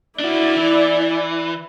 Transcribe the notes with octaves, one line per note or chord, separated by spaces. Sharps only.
D4 E4 F#4 D5
E3